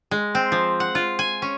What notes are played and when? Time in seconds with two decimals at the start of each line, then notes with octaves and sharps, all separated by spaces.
0.11 G#3
0.35 C4
0.52 F3
0.80 F#5
0.95 F4
1.19 G#5
1.42 C#4